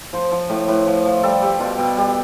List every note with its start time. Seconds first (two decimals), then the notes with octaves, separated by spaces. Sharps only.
0.13 F3 C5
0.32 F3
0.50 A2
0.68 A2 B4
0.87 F3
1.05 F3
1.23 G3 A4
1.42 G3 G4
1.60 B2 F4
1.79 B2
1.97 G3